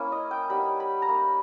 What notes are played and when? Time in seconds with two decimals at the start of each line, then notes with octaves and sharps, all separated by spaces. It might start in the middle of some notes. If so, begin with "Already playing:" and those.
Already playing: A#3 C#4 E4
0.12 D#5
0.31 G5
0.50 G3 B3 D#4 B5
0.80 B5
1.02 A#5
1.08 A#3 D#4 B5